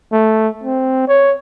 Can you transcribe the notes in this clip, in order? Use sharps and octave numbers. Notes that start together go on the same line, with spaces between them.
A3
C4
C#5